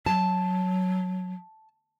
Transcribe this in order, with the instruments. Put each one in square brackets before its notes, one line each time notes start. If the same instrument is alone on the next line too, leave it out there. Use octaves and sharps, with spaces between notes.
[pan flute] F#3 [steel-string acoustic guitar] A5